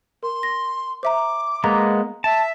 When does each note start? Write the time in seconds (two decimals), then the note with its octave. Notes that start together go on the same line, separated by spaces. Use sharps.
0.23 A#4 C6
0.43 A#6
1.03 C5 E5 A#5 D6
1.64 G#3 A#3 B3 A#5
2.24 E5 A5